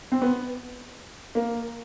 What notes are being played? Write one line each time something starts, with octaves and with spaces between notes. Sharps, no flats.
C4
B3
A#3